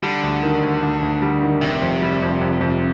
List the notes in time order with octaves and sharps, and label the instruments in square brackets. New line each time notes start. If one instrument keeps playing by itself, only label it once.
[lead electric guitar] D3 [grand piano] G3
[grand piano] D2
D#3
D2
D2
D2
G3
D#3
[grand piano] F1 [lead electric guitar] C3
[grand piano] F2
G3
F2
F2
F2